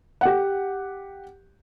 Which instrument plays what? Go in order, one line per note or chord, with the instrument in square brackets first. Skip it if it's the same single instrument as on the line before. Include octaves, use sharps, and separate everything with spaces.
[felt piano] G4 F#5